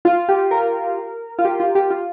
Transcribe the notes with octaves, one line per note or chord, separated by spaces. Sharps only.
F4
G4
A#4
F4
G4
F4
G4
F4